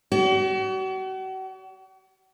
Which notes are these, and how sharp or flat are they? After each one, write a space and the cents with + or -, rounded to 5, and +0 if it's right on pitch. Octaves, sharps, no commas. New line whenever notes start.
F#4 +40 D5 -40